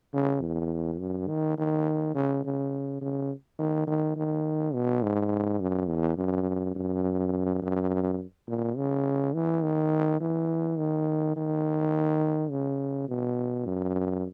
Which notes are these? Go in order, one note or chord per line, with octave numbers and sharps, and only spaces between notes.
C#3
E2
F#2
D#3
D#3
C#3
C#3
C#3
D#3
D#3
D#3
B2
G#2
F#2
E2
F#2
F#2
F#2
A#2
C#3
E3
D#3
E3
D#3
D#3
C#3
B2
F#2